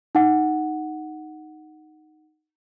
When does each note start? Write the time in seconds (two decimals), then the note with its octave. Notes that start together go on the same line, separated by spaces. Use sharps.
0.15 D#4 F#5